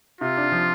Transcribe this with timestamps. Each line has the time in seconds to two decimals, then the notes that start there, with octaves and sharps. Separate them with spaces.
0.21 C3 F4
0.37 D4
0.52 F3